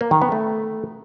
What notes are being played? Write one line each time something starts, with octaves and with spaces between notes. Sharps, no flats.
A#3
D#3
B3
A3